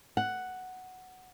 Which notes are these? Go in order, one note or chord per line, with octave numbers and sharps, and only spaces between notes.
F#5